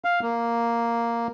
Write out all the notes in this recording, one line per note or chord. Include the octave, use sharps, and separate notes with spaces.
F5
A#3